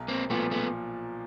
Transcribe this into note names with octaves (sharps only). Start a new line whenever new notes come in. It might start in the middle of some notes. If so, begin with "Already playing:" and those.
Already playing: B1
A#3 C4
A#2 F3 A3 B3
A3 B3